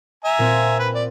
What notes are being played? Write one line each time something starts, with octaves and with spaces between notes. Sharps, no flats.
E5 G#5 A#5
A#2 C4 F4
B4
D5